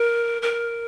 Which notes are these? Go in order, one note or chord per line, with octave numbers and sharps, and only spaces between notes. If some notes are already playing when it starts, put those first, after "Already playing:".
Already playing: A#4
A#4